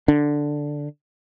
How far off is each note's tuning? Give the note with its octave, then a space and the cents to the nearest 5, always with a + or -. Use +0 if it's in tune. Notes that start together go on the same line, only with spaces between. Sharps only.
D3 +0 D4 +0